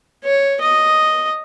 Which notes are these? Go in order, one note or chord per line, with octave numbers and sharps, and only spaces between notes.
C#5
D#5